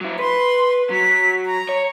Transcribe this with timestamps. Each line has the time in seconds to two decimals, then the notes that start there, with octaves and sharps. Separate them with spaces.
0.01 F#3 E4
0.19 B4 C6
0.90 F#3 B6
1.46 A#5
1.69 C#5